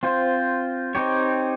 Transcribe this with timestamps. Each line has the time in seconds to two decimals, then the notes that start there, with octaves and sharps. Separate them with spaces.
0.03 C4 F4 C5
0.95 C4 D#4 G4 C#5